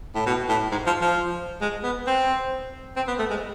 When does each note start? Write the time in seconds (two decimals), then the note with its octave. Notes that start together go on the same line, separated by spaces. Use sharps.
0.15 A2
0.26 B2
0.49 A2
0.72 G#2
0.87 F3
1.02 F3
1.61 G#3
1.84 B3
2.07 C4
2.96 C4
3.08 B3
3.19 A3
3.30 G#3